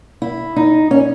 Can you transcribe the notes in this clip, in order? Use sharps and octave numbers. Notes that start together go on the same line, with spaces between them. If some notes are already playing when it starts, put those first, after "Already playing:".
E4
D#4
C#4